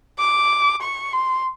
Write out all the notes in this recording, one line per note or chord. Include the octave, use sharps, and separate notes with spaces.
D6
C#6
C6